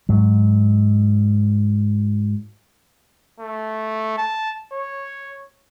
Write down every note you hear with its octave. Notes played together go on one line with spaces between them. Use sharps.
G#2 F#3
A3
A5
C#5